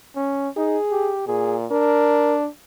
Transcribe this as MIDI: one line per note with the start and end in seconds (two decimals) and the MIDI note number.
0.16 0.49 61
0.57 0.78 63
0.57 1.12 68
0.91 1.24 67
1.28 1.66 46
1.28 1.56 68
1.71 2.47 62
1.71 2.37 70